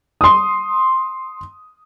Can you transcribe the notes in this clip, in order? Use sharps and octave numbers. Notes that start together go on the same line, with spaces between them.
C6 D#6